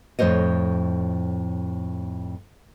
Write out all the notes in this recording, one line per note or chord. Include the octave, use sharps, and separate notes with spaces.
F2 A2 C5 C#5 D#5